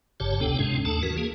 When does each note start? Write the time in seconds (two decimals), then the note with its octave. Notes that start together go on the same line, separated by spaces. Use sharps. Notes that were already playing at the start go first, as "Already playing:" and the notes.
0.20 G1 G2 C#3 G4 C#5 A5
0.41 D2 C3 B3 D4 A4 G5
0.59 G#2 C3 G#3 C#4 D4
0.85 D#2 A3 D4 A4 A5
1.03 E3 F#4 A#4
1.18 A#3 G#4